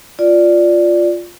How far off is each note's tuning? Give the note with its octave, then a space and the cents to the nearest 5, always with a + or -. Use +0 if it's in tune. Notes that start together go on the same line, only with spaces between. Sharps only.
F4 +0 D5 +0